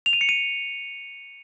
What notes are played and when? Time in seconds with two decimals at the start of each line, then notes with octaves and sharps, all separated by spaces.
0.06 F7
0.13 D#7
0.21 C#7
0.29 D#7